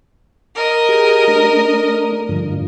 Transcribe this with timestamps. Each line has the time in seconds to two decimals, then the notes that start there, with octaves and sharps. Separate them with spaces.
0.56 A#4 D#5
0.89 G4 G#4
1.28 A3 D4
2.29 G2 D3 F3